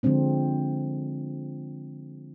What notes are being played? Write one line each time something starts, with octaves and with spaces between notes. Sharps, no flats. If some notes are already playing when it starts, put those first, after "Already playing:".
D3 F3 G#3 C4 D4